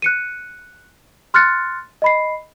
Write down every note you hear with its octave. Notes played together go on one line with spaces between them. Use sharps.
F#6 C#7 D#7
C6 F6 F#6 A6 C#7
D#5 B5 C7